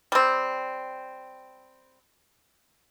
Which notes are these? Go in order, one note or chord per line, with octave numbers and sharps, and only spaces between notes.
G3 C4